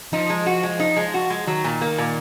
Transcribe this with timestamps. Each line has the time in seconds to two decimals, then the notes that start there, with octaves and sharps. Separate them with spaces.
0.13 F3 D#4
0.30 G#3
0.46 F#4
0.63 G#3
0.80 D#4
0.97 G#3
1.14 F#4
1.30 G#3
1.47 D#3 F#3
1.64 A#2
1.81 A#3
1.98 A#2